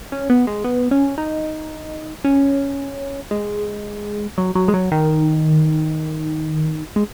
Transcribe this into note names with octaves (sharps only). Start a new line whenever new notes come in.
C#4
B3
G#3
B3
C#4
D#4
C#4
G#3
F#3
F#3
G#3
F#3
D#3
G#3